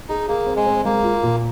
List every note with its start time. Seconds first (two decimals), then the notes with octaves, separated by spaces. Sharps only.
0.09 D#4 G#4
0.28 A#3 G#4
0.47 C4
0.56 G#3
0.66 C4
0.85 G#3 A#3
1.04 F4
1.23 A#2